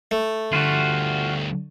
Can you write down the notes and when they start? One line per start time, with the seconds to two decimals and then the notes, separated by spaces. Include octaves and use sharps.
0.11 A3
0.53 D2 D3 G3 F4 F#4